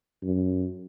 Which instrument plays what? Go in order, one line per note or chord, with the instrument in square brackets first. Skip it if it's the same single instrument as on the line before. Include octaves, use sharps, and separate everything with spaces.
[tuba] F#2